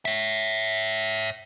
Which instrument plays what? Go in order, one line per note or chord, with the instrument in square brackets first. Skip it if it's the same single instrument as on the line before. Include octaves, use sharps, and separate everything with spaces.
[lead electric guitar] C#5 E5